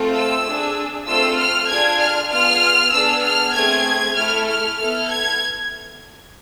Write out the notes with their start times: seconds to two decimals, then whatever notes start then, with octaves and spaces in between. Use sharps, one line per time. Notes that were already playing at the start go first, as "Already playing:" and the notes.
Already playing: A3 C4 F4 A4
0.14 E6
0.45 D4 G#4
1.06 A3 C4 F4 A4 E6
1.38 F6
1.69 D4 F4 G#4 G#6
2.00 F6
2.31 B3 F4 G#4 F6
2.92 B3 D4 G#4 E6
3.23 F6
3.54 A3 C4 G#4 G#6
4.16 A3 E4 A4 F6
4.48 F6
4.78 B3 E4 A4 F6
5.10 G#6